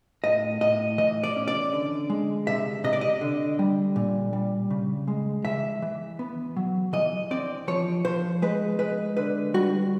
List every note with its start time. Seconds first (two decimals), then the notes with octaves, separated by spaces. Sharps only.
0.24 A2 D#5
0.61 A2 D#5
0.98 E3 D#5
1.24 D5
1.36 C#4
1.48 D5
1.73 D3
2.10 G#3
2.47 C3 E5
2.84 C3 D#5
2.93 D5
3.01 D#5
3.21 D3
3.59 G3
3.96 A#2
4.33 G3
4.70 C#3
5.08 G#3
5.45 E3 E5
5.82 E3
6.19 B3
6.57 F#3
6.93 E3 D#5
7.31 C4 D5
7.68 F3 C#5
8.05 F3 C5
8.42 G#3 B4
8.79 G#3 B4
9.17 D3 B4
9.54 G3 F#4